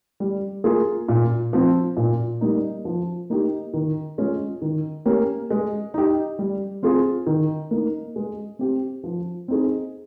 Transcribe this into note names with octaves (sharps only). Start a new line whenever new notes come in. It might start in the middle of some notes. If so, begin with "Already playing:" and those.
G3
A#3 F4 G#4
A#2
F3 C4
A#2
G3 A#3 D#4
F3
A#3 D#4 G4
D#3
G#3 C#4 F4
D#3
A#3 C#4 G4
G#3
D#4 G4
G3
C4 F4 G#4
D#3
A#3 D#4
G#3
C4 G4
F3
C4 D#4 G#4